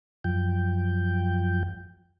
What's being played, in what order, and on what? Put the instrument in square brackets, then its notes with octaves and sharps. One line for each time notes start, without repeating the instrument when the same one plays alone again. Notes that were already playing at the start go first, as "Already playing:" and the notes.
[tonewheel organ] F#2 F3 G5